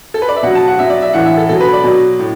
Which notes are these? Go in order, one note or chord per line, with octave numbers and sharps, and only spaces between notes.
A4
B4
D5
E5
B2 F#3 F#5
A5
F#5
B2 F#3 E5
D5
E5
A2 E3 F#5
E5
A4
B2 F#3 A4
B4
D5
B2 F#3
A2